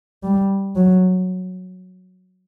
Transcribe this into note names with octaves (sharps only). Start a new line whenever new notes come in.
G3
F#3